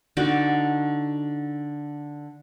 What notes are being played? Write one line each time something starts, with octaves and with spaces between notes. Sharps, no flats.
D3 D#4 F#4 D5